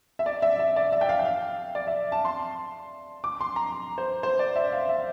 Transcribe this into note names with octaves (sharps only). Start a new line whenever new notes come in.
E5
D5
E5
E5
D5
E5
G5
F5
G5
F5
D5
E5
A5
C6
D6
C6
A#5
C5
C5
D5
E5
F5
E5